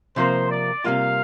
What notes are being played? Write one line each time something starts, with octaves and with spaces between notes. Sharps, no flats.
C3 F3 A#3 C5
D5
C3 G3 A#3 F4 F5